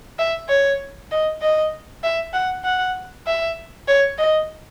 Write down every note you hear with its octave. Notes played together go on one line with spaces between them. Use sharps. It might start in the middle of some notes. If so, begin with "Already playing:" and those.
E5
C#5
D#5
D#5
E5
F#5
F#5
E5
C#5
D#5